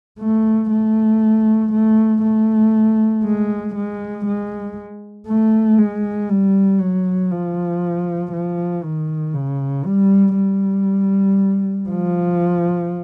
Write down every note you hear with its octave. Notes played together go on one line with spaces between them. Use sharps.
A3
A3
A3
A3
G#3
G#3
G#3
A3
G#3
G3
F#3
F3
F3
D#3
C#3
G3
G3
F3